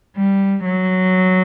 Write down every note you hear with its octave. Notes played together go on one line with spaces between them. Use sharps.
G3
F#3